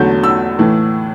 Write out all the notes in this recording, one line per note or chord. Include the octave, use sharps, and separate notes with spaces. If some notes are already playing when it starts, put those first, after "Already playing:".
Already playing: E2 D3 F#3 A3 G6
E6
A2 E3 A3